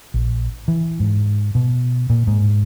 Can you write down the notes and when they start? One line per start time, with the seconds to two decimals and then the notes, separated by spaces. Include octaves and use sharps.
0.14 A#1
0.68 E3
1.00 G#2
1.55 B2
2.10 A#2
2.27 G#2